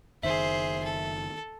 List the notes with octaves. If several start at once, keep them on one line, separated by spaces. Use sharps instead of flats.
F#1 D#3 G#4 C5 E5
A4